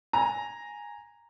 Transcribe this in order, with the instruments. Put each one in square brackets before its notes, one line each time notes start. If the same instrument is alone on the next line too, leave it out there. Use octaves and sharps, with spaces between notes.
[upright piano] G#5 A#5